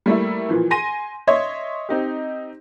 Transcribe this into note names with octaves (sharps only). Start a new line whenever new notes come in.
G3 A3 A#3 E4
A#2 E3 F3
G#5 C6 A#6 D#7
C#5 D#5 E5 C6 G#6
C4 D#4 G4